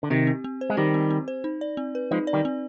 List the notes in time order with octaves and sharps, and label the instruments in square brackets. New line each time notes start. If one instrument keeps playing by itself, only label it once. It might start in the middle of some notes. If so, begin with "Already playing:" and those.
[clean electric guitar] D3
[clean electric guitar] C3 D#3 [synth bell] G4
[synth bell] C4
C4
C5
[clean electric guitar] G#3
[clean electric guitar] D#3 G3 [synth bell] G4
[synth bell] C4
C4
C5
D#4
D5
C4
B4
[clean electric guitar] F3 G#3 [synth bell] D#4
[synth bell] D5
[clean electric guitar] D#3 G3
[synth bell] C4